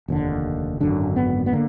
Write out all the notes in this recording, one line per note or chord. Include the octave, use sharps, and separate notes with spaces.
F1 D#2 D3
G#1 F#2 D3 D4
B3
B3
D3 A#3